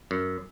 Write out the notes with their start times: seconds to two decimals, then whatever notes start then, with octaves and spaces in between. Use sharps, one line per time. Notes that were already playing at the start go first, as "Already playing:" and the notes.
0.11 F#2